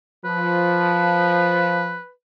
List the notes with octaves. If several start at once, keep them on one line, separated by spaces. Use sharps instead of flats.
F3 B4